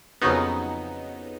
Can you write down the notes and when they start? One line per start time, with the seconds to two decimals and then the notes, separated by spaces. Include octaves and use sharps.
0.22 F2 C#3 F#3 B3 D#4